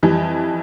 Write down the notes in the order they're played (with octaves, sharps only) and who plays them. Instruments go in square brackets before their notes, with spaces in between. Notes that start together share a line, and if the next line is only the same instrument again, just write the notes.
[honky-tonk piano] F2 E3 G3